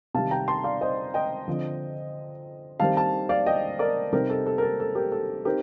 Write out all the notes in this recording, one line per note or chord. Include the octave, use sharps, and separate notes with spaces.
C3 D#3 G3 F5 A5
G5 A#5
A5 C6
D5 F5
C5 D#5
D#5 G5
D3 F3 C4
D#3 G3 C4 F5 A5
F5 A5
D5 F5
D#5 G5
A#4 D5
C3 G3 C4 D#4 G4 A#4
A4
A4
A#4
A4
A4
G4 A#4
A4
C4 D#4 G4 A#4